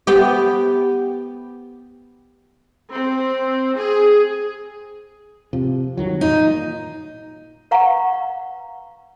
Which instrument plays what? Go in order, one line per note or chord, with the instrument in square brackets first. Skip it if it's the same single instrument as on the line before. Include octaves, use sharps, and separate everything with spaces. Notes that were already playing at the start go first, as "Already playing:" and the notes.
[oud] B3 G4
[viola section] C4
G#4
[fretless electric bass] C3 F3
G1 D#3 F#3
[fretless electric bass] A#2 [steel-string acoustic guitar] D#4
[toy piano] B4 F5 F#5 A#5 C#6